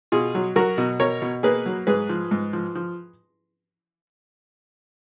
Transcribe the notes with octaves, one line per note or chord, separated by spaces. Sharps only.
B2 F4 G#4
F#3
F#3 F#4 A#4
B2
B2 A#4 C#5
B2
A#3 G#4 B4
F#3
G#2 G#4 B4
F3
G#2
F3
F3